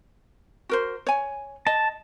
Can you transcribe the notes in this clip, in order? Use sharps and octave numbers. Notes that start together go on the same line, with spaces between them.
F#4 A#4 C5
C#5 G#5
D#5 A5